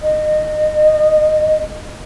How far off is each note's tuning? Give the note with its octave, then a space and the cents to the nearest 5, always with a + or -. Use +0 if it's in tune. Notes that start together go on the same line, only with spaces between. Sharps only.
D#5 -20